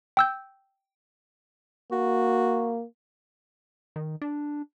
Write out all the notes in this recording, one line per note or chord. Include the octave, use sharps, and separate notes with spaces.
G5 E6 G6
A#3 F#4
D#3
D4